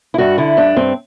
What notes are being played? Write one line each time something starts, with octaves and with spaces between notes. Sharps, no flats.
E4
G2 F#4
D3 E4
G2 D4
G2 C4